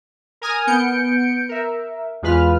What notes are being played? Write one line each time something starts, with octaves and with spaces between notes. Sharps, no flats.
A#4 G#5 D#6 F6
B3 G6 C#7 D7
A#4 E5
E2 G#3 F4 B4 B5 F6